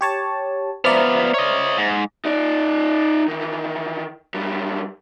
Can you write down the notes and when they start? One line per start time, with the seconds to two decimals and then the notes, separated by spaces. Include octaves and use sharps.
0.01 G4 C#5 A5
0.85 F3 B3 C5 D5 E5 A#5 F6
1.34 C#5 D#5
1.78 G#2
2.25 D#4 D5
3.28 D#3 E3
4.34 F#2 G3